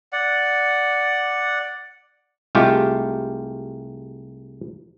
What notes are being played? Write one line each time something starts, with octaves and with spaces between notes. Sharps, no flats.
D5 F#5
C2 G#3 A3 F4 G4